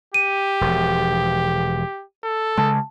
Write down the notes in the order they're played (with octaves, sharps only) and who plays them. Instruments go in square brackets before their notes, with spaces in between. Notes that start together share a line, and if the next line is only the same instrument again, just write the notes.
[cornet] G4 [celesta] D#7
[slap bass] E1 F3
[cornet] A4
[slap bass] C#3 G#3 [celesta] A5